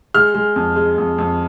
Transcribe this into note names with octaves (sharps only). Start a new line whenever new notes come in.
G#3 F6
G#3
F2
G#3
F2
F2